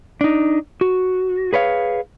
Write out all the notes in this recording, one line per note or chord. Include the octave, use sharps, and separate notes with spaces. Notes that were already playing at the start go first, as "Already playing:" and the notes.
D4 D#4
F#4
G#4 B4 C#5 F5